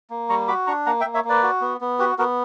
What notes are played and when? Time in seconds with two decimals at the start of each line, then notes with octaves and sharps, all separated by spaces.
0.10 A#3
0.29 G3 A#5 C#6
0.48 F#4 B5 D6
0.67 D4 A#5 C#6
0.86 A#3 F#5 A#5
1.01 E5 G5
1.05 A#3
1.14 C#5 E5
1.25 A#3 B4 D5
1.43 F#4
1.61 B3
1.81 B3
1.99 F#4 G4 B4
2.18 B3 F#4 A#4